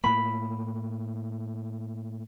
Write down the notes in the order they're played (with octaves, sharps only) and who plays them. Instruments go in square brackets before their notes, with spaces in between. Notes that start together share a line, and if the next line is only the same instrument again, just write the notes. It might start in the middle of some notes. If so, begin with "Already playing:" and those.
[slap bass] A2 A#3 [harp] B5